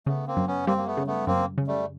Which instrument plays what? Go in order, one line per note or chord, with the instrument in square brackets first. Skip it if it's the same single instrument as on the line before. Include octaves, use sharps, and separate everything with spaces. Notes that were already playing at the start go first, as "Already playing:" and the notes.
[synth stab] C#3 [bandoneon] A3 B3
[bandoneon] A#3 C4
[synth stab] F#2
[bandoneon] B3 C#4
[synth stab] G3 [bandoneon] A#3 C4
[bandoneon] A#3
A3 B3
[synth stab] C#3
[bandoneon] A3 B3
[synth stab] F#2 [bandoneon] A#3 C4
[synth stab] C#3
[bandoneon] G3 A3